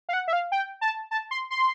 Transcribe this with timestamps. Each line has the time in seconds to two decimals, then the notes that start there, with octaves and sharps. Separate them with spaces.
0.09 F5
0.13 F#5
0.28 E5
0.33 F5
0.52 G5
0.81 A5
1.11 A5
1.31 C6
1.50 C6